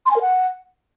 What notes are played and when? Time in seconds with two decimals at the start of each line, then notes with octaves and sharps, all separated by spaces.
0.06 C6
0.11 G#5
0.16 A#4
0.21 F#5